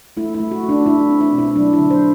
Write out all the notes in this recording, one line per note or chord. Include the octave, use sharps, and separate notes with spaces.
A3 E4
E4
A3
F#4
A3
D4
A3 E4
C4
E4
B2
E4
F#3 D4
E4
D3
C5